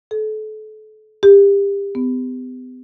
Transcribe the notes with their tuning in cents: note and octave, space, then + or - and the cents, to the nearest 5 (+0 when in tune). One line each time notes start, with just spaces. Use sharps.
A4 -35
G4 +30
B3 +40